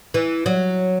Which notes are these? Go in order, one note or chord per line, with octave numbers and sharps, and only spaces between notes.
E3
F#3